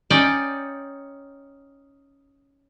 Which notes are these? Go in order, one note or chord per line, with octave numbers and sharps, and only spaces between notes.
C#4 D#4 D5 G5